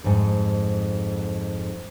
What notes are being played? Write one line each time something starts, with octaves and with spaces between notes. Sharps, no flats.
F2 G#2